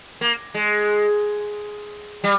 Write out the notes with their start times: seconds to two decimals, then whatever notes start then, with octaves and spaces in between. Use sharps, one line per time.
0.21 A#3
0.54 G#3
2.24 G3